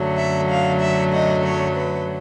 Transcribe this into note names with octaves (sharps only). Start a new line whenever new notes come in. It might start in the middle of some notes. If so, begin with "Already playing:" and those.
Already playing: F#2 D3 F#3 A3
E5
F5
E5
D#5
C#5
B4